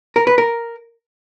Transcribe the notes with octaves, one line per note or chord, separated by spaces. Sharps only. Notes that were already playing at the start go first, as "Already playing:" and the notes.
A#4
B4
A#4